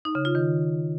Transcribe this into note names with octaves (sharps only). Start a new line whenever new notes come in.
D#4
C#3
F4
D#3